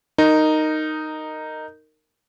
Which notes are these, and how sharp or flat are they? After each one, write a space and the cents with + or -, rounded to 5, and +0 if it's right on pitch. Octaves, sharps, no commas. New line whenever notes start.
D#4 -5 A#4 -15